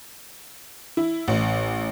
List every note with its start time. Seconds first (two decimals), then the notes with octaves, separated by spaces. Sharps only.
0.97 E4
1.28 A1